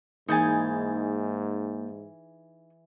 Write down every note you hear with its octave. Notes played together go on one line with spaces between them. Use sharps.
G#2 E3 A#3 D#4 G#4 G#5 G6 A6